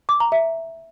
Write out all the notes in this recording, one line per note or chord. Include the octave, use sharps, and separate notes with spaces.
D6
A#5
E5